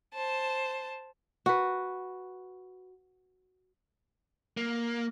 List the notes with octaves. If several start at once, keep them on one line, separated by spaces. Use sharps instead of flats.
C5 A5
F#4 B4
A#3